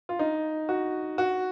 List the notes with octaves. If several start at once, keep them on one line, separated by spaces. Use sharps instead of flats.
F4
D#4
F#4
F#4